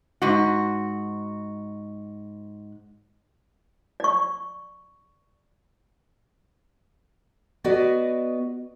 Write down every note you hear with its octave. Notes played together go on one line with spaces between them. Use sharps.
G#2 F#4
D5 C#6
B3 F#4 B4 D5 D#5